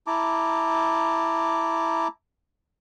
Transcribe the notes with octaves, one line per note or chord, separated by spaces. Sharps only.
E4 A5 A#5 D6